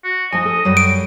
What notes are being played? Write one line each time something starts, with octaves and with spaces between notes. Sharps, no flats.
F#4
F3 D#4 D#5 G#5 A5
A4
F#2 F#3 G3
D7